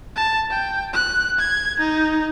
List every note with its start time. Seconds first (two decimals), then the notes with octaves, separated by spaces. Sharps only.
0.16 A5
0.50 G5
0.94 F#6
1.39 G#6
1.80 D#4